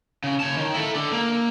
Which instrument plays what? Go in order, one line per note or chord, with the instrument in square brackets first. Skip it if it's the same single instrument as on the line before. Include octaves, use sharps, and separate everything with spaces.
[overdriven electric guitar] C#3
C#5 A5
D#3
E4 A4
D3
A#3